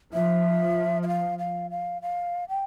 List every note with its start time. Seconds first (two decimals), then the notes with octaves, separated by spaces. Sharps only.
0.13 F3 E5
1.03 E5
1.08 F5
1.39 F5
1.71 F5
2.02 F5
2.49 G5